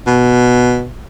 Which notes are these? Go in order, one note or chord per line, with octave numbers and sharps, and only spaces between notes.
B2